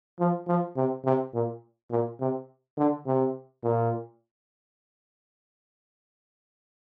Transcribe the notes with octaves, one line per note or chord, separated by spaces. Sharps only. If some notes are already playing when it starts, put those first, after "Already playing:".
F3
F3
C3
C3
A#2
A#2
C3
D3
C3
A#2